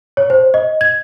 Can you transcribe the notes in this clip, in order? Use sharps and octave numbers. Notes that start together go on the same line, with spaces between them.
C#5
C5
D#5
G#6